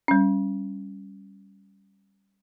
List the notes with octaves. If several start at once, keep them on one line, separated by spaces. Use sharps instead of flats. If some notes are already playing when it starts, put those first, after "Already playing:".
G3 C#4